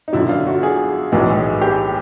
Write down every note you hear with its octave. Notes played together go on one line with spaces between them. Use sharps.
D#4
F#2 D3 F#3 E4
F4
F#4
G#4
B1 A2 E3 G#3
G4